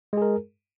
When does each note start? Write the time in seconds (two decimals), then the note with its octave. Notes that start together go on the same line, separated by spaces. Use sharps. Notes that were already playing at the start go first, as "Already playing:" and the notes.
0.13 G#3
0.17 G#4
0.22 A#4